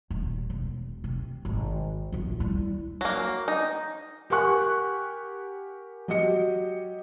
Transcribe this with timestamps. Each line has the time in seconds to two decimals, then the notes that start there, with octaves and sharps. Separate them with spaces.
0.11 D#1
0.50 E1
1.04 C3
1.45 G#1
2.12 A#1 F2
2.40 G3 E4
3.01 F#3 A#3
3.48 D#4
4.30 G4 A#4 F#5 G#5 C#6 F#6
6.08 F#3 G4 D#5 C#7